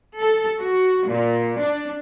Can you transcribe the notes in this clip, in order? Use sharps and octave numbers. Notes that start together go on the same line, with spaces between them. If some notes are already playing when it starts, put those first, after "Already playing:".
A4
F#4
A#2
D4